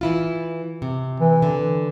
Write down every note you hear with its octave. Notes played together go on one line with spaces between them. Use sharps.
E3 E4 F4
C3
E3
D3